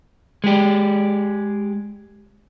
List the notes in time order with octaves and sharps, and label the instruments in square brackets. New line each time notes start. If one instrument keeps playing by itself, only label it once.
[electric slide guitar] G#3 G4